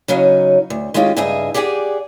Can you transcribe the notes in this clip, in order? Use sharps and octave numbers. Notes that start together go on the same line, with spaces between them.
C#3 F#3 C#4 D#4
D2
D#3 G#3 C#4 F4 G4
G2 C#3 D#4 G#4 E5 G#5
G4 G#4 D5 F#5 G#5